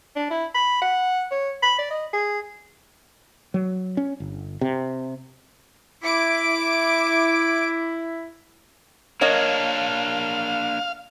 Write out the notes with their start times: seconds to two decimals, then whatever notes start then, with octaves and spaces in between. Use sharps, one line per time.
0.16 D4
0.31 E4
0.55 B5
0.82 F#5
1.31 C#5
1.63 B5
1.78 D5
1.91 D#5
2.13 G#4
3.54 F#3
3.97 C#4
4.20 G1
4.61 C3
6.03 E4 D6 D7
9.21 A#3 D4 A#4 C#5 D#5 F5